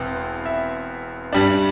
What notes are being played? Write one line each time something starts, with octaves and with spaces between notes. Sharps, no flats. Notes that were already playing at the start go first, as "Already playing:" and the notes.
Already playing: E1 E2 E3 C4 G5
E5
G2 G3 D4